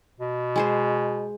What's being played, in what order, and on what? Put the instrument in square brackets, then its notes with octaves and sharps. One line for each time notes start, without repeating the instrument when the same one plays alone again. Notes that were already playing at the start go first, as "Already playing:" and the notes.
[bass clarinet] B2
[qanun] G#3 G#4 C5